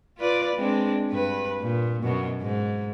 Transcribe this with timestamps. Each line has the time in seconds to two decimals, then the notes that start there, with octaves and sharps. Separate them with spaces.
0.18 F4 B4 D5
0.56 G#3 C4 D4
1.10 G2 B4
1.60 A#2
2.02 F#2 B2
2.41 G#2